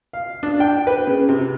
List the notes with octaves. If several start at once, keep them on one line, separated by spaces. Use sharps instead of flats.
F5
D4
G5
B4
C#3
C3